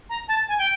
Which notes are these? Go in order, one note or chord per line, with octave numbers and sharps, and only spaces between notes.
A#5
A5
G#5
G5